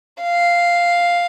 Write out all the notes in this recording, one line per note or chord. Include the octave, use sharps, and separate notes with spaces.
F5